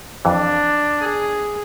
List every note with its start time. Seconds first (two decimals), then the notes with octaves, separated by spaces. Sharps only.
0.25 F2 E3 D4
1.01 G#4